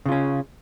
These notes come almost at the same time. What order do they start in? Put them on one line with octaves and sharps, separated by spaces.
C#3 F4 C#4